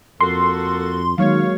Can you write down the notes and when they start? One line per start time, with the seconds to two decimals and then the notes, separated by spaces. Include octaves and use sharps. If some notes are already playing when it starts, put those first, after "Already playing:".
0.21 F2 A#3 F#4 A4 C6
1.18 D#3 F#3 G#3 A#3 C#5 F5